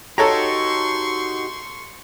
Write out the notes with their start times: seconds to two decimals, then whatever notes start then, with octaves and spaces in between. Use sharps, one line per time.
0.18 D#4 F#4 G4 A4 C#5 A#5 C6 C#6